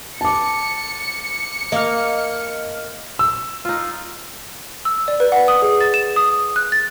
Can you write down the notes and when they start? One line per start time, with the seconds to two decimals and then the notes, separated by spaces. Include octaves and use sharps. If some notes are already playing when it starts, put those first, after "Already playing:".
0.21 A5 D6 C#7
1.72 A#3 D#5 F6
3.19 E6
3.65 D#4 F4
4.85 E6
5.08 D5
5.20 B4
5.32 F#5
5.48 D#6
5.62 G#4
5.81 A6
5.94 E7
6.16 D#6
6.56 F#6
6.72 A6